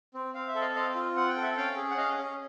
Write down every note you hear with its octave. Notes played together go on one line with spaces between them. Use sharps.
C4
C4 F5
E5
A4
D#5 F5
C4 D#5 F5
F4
C4 F#5
G5
A4
E5 F#5
C#4 F5 G5
G#4
F#5
C#4 D#5 F5
C#4